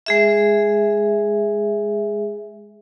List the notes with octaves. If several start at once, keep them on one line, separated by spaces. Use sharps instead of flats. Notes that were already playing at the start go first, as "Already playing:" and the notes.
G#3 G#4 E5